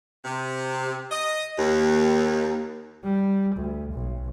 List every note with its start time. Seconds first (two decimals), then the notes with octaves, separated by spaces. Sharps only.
0.25 C3
1.12 D#5
1.58 D#2
3.04 G3
3.56 D2
3.93 B1